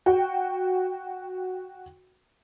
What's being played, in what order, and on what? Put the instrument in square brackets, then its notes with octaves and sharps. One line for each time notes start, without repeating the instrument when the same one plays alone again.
[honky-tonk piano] F#4 G5